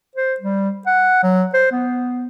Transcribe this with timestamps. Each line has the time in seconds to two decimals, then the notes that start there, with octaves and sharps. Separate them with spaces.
0.15 C5
0.40 G3
0.87 F#5
1.23 F#3
1.54 C5
1.72 B3